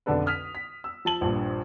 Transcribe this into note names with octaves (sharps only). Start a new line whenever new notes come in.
F1 B1 D3 D4 A4 B4
D#6 F6 B6 F7
B6
E6
F3 A5 F#7
A#1 G2 A#2